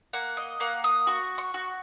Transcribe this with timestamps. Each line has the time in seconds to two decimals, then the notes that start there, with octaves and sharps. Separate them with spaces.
0.13 A#3 F#5
0.37 D#5
0.60 A#3 F#5
0.84 D#6
1.07 F#4 C#6
1.38 C#6
1.54 F#4